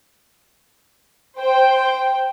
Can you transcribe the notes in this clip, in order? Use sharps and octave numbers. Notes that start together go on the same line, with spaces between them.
C5 G5